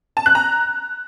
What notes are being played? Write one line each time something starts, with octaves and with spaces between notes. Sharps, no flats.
A5
F#6
A#5